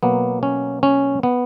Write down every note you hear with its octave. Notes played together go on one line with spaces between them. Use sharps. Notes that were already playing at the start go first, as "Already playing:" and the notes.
B2 F#3 A#3 B3
C#4
C#4
B3